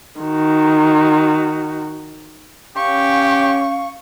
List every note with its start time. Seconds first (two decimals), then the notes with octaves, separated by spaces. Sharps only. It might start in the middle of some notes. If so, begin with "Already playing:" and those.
0.20 D#3 F#4
2.77 C#4 G4 F5 C#6